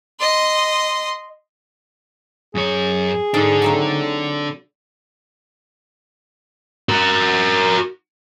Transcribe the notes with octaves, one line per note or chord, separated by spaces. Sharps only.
D#5 C6
F#2 G#4 C#5
G#2 D4 A4
F#3 A3 C4
F#4 A#4